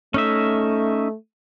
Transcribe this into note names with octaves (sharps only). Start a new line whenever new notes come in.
A3 C#4 D#4 E5